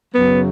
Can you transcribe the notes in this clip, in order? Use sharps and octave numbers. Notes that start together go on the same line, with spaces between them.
F#2 C#3 F#3 B3